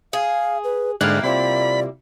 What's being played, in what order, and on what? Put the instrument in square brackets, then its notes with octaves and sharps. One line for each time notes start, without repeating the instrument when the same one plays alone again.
[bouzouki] G#4 [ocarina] F5
[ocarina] B4
[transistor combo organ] G#2 D3 [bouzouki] G3 A#3 E4 [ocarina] E5 [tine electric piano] F6 F#6
[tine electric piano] C3 C4 F4 [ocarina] D5 [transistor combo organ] B5